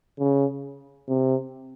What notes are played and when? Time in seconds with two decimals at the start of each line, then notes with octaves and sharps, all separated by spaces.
0.19 C#3
1.09 C3